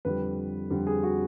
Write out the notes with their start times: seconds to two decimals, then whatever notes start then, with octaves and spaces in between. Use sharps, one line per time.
0.05 F2 D3 G3 B4
0.70 F2 D3 G3
0.87 G#4
1.03 F#4